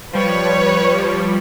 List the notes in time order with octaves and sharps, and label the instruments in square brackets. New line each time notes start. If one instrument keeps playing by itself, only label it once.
[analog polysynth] F3 G3 [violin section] B4 C#5